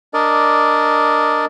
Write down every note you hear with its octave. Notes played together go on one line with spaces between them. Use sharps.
D4 A#4 D5 D#5